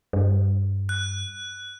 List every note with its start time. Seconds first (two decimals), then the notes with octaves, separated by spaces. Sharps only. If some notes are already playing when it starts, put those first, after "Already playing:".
0.13 G2
0.89 F#6